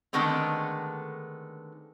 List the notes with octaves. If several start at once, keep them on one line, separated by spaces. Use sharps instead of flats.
D3 D#3 G#3 A3 B3 C4